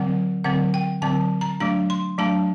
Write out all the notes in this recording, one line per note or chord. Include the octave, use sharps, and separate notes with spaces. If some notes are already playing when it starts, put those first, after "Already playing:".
Already playing: D3 F#3 C4 F#5
D3 F#3 C4 F#5
G5
D3 F#3 C4 A5
A#5
F#3 A3 D4 A#5
C6
F#3 A3 D4 A5